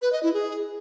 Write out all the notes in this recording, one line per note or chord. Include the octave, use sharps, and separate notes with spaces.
B4
D#5
E4
G#4